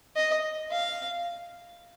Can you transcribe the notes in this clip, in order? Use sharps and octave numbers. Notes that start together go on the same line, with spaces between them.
D#5
F5